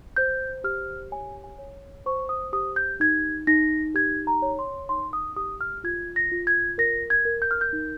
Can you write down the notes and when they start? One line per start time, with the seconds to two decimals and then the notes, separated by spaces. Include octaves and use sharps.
0.16 C5 G6
0.64 G4 F6
1.11 C#5 G#5
1.44 G#5
1.58 C#5
2.06 C5 C#6
2.29 D#6
2.53 G4 D#6
2.76 G6
3.00 D#4 G#6
3.47 D#4 A#6
3.95 G4 G#6
4.27 A#5
4.42 C#5
4.59 C6
4.89 D#4 C6
5.13 D#6
5.36 G4 D#6
5.61 F6
5.84 F4 G#6
6.16 A#6
6.32 F4
6.47 G#6
6.78 A#4 A#6
7.10 G#6
7.25 A#4
7.42 G6
7.51 F6
7.61 G6
7.73 D#4